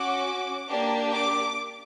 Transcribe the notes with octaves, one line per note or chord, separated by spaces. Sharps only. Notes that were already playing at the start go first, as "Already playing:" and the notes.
Already playing: C#4 F#4 D6
A#3 D4 G4
D6